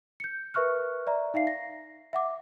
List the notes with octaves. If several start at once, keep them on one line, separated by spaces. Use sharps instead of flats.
G6 C#7
A#4 B4 E5 C#6 F6 F#6
D5 E5 A#5
D#4 E5 F5 C7
A#6
E5 F#5 D6